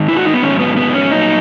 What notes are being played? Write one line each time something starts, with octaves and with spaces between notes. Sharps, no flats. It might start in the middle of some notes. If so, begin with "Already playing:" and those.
Already playing: G#2 D#3
E4
F#4
D#4
B3
G#2 D#3 F#3 C#4
B3
B3
C#4
A#2 F#3 D#4